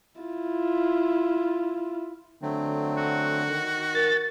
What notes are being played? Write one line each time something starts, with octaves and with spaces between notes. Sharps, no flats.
E4 F4
D3 F#3 A3 C4
F#4
D#3
A#4 A6